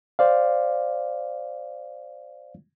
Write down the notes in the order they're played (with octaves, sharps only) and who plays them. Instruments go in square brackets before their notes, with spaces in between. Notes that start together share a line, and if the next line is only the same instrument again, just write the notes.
[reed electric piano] C5 D5 F5